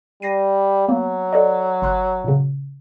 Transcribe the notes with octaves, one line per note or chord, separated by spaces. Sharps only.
G3 A#6 C7 D#7
F#3 A#3 B3
A4 D5 D#5
G1 C6 F#6
A#2 C#3